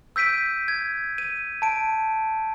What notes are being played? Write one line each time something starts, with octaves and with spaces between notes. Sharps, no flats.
E6 G6 B6 D7 D#7
G#6
D#7
A5 D7